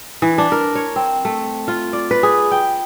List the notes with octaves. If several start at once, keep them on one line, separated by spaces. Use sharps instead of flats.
E3
D4
A#4
C#5
C4
A3
F4
D5
B4
G#4
G5